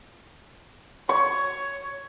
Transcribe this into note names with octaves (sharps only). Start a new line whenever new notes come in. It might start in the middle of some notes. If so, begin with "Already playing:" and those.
C#5 C#6